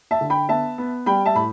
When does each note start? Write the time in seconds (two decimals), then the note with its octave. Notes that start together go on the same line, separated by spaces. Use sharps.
0.11 E5 A5
0.21 D3
0.30 G5 B5
0.49 B3 E5 A5
0.78 B3
1.06 G3 G5 B5
1.26 E5 A5
1.35 A2 B5